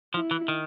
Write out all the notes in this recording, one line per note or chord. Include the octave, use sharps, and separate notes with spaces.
F3 E4
E3
D#3